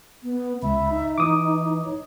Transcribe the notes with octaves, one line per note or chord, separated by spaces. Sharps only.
B3
C#2 E5 B5
D#4
E3 D6 D#6
C#5